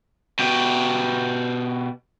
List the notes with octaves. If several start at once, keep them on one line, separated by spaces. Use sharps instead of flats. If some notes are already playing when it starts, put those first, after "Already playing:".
B2 G4